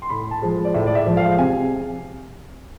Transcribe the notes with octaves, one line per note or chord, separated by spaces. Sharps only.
C6
A2 B5
A5
F3 G#3
D5
A2 E5
D5
E5
F3 G#3
F5
C3 G#5